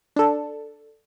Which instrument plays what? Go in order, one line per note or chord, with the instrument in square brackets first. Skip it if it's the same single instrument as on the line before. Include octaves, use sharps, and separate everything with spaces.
[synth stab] D4 A4